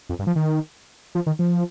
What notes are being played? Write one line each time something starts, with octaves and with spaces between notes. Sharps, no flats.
F2
G2
F3
D#3
F3
D#3
F3